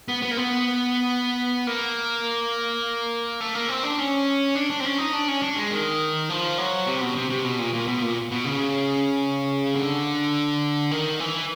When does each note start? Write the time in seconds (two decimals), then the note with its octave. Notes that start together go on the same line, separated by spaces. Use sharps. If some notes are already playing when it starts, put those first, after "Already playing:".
0.08 B3
0.22 B3
0.31 A#3
0.37 B3
1.67 A#3
3.41 A3
3.55 A#3
3.69 C4
3.83 D4
3.98 C#4
4.55 D4
4.70 D4
4.80 C4
4.85 C#4
4.98 D#4
5.13 D4
5.28 C#4
5.42 D4
5.56 G#3
5.70 D#3
6.29 F3
6.58 F#3
6.86 C3
7.01 B2
7.15 C3
7.30 C3
7.44 B2
7.59 A#2
7.73 A#2
7.87 B2
8.02 A#2
8.31 B2
8.45 C#3
9.75 D3
10.91 D#3
11.20 E3